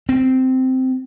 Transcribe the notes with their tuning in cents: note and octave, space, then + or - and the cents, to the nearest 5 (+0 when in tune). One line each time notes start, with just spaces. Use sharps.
C4 -10